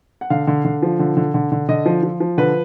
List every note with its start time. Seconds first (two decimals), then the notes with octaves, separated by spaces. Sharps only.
0.21 F#5
0.30 D3 F5
0.47 D3
0.65 D3
0.82 F3
0.99 D3
1.17 D3
1.34 D3
1.52 D3
1.69 D3 D#5
1.86 F3
2.03 F3
2.20 F3
2.38 D3 B4